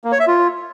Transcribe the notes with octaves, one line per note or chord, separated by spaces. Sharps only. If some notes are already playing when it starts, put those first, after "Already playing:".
A#3
C#5
E5
F4